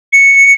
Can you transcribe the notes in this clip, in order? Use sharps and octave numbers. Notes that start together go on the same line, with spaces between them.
C#7